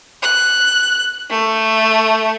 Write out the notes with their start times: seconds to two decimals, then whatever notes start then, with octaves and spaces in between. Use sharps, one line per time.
0.23 F#6
1.30 A3